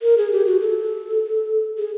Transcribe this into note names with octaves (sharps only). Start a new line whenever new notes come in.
A#4
G#4
G4
F#4
A4
G#4